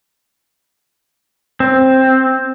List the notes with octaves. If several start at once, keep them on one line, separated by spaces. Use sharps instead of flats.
C4